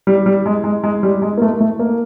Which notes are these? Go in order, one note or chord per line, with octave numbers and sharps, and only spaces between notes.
G3
G3
G#3
G#3
G#3
G3
G#3
A#3
A3
A3
A#3